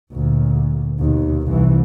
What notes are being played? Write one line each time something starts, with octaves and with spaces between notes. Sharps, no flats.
D2 A#2
D#2 B2
C2 E3